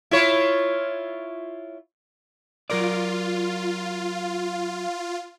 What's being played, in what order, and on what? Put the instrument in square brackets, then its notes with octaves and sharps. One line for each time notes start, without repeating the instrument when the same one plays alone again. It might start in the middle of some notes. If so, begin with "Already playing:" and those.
[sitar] E4 F4 C#5
[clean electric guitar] F#3 A#4 D5 [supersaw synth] F4